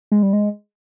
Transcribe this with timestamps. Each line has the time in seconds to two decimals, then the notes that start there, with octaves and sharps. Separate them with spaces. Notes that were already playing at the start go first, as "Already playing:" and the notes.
0.12 G#3
0.23 G3
0.33 G#3